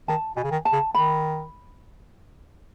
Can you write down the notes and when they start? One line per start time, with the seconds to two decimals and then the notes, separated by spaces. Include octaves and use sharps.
0.08 D#3 A5
0.36 B2 G#5
0.43 C#3
0.51 D#3
0.65 A5
0.72 C#3
0.93 D#3 B5